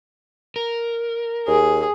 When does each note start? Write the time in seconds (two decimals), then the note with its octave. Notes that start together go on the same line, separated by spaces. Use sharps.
0.56 A#4
1.48 D#2 G#4